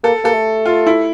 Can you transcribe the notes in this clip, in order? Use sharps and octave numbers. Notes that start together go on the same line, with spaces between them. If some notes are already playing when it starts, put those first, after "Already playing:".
A#3 A4
A#3 A4
A3
F4
E4